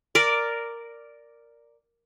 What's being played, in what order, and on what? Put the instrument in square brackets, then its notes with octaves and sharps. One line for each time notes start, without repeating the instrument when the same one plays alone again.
[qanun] A#4 D5